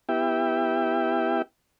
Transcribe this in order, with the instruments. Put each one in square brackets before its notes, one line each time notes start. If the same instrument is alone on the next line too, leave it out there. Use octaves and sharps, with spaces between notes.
[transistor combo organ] B3 E4 G4 E5 G5